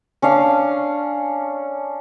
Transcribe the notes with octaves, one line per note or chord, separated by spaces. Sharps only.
C#4 D4 F5